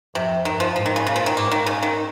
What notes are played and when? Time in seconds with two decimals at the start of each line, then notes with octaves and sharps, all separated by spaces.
0.15 F2 C3
0.45 G2 D#3
0.60 F3
0.76 G#2 F3
0.86 D#3
0.96 C#3
1.06 A#2 C#3
1.16 F3
1.26 D#3
1.37 G#2 A#3
1.52 D#3
1.66 C#3
1.83 D#3